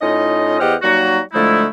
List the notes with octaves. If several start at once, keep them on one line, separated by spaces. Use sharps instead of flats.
A2 C#4 D#4 F4 D#5
E2 G4 C5 D#5 F#5 F6
F#3 G3 A#3 D#4 F#4
D3 F3 G#3 A3 D#4 E4